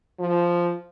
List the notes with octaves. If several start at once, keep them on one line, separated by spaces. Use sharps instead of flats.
F3